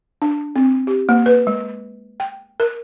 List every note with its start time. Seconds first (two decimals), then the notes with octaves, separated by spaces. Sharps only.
0.22 D4
0.56 C4
0.87 G4
1.09 A#3
1.26 B4
1.47 G#3
2.20 G5
2.60 A#4